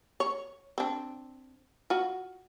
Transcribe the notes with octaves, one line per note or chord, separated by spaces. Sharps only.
C#5
C4 D4
F4 F#4